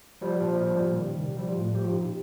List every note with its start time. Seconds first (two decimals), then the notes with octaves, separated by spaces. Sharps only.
0.21 F3 G3
0.40 A#2 F3
0.60 F3 G3
0.79 A#2
0.98 D#3
1.17 C3
1.36 F3 G3
1.48 F4
1.55 A2
1.61 A3
1.75 F3 G4
1.84 F4
1.93 A#2 D#4
2.03 G4